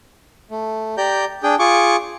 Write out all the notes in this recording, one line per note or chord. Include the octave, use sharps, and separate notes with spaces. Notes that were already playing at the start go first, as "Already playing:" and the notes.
A3
G4 D5 A#5 G6
D4 G#4 G5
F4 G#4 C#6 D6